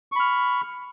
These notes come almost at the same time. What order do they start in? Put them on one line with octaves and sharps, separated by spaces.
C#6 B5 F6